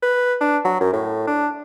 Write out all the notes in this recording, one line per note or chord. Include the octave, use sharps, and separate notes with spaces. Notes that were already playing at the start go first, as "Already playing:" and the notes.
B4
D4
F#3
F#2
A2
D4